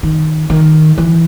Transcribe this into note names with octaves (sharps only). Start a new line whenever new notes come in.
D#3
D#3
E3